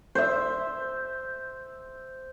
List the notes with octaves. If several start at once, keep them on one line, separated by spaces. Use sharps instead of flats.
C5 E5